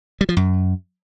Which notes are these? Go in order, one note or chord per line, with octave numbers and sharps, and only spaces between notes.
G3
F3
F#2